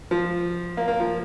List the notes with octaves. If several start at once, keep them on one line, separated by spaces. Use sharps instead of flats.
F3
A#3
A#3
F3